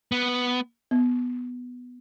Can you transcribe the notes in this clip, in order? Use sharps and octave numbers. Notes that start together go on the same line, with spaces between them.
B3
B3